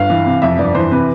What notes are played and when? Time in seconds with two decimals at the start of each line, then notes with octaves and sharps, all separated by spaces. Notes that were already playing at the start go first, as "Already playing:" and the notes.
Already playing: G1 F5
0.10 E3
0.26 C3
0.42 F2 E5
0.59 G1 D5
0.75 E3 C5
0.91 C3 B4